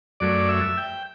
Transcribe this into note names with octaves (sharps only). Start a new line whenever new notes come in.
F#2 F#3 A3 D5
E5
G5